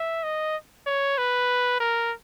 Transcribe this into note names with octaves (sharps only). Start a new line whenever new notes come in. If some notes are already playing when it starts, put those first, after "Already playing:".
Already playing: E5
D#5
C#5
B4
A#4